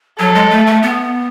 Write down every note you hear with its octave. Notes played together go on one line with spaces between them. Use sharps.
F#3 A4
G#3
A3
A3
B3